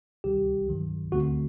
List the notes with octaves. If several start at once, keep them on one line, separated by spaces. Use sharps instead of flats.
D2 C3 D#3 G3 G4
G2 D#3 F#3
D2 D3 A3 C4 F#4